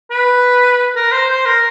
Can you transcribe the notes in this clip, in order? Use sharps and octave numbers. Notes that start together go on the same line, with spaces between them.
B4
A#4
C5
C5
A#4